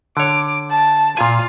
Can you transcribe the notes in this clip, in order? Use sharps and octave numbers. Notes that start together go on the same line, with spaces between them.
D3 C#5 D6
A5
A#2 F4 G#5